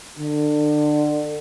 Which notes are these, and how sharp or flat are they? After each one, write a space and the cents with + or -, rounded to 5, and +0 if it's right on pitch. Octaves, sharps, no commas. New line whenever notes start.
D3 +30